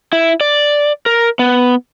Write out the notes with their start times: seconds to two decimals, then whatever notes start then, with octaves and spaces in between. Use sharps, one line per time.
0.13 E4
0.41 D5
1.06 A#4
1.39 B3